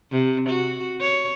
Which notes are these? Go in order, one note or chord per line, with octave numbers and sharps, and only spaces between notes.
C3
F#4
C#5